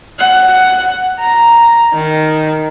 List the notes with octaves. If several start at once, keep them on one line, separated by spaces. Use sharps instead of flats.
F#5
A#5
D#3